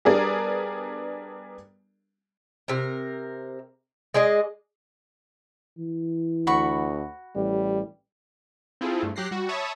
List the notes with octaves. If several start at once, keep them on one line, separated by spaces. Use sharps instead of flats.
G3 B3 D4 G#4 A#4 D5
C3 A#4
G#3 G#4 D5 D#5
E3
D2 F#4 B5 C#6
A1 G3
C4 E4 F4 G#4 A4
G2 A3
F#3 G4 F#6 A#6 C7
G3 F#4
C#5 E5 A5 B5 C#6 D#6